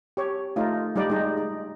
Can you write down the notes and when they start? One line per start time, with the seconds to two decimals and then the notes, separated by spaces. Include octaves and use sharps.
0.17 G4 C#5
0.56 A3 D#4 F4
0.96 G3 D#4 D5
1.10 G#3 D#4
1.37 D#4